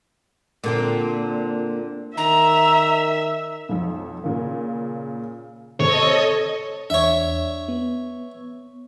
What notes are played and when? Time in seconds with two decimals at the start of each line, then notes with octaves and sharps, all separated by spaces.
0.64 A#2 D3 C4
2.17 D#3 E5 A#5
3.69 B1 F2
4.24 A#2 C#3 A#3
5.80 C3 C4 A4 C#5 D#5
6.90 E2 D4 C#5 E5
7.68 B3